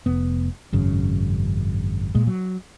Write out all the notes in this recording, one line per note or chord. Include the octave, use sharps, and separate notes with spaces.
F1 B3
G#1 F#2 C#3
A#2 G#3
F#3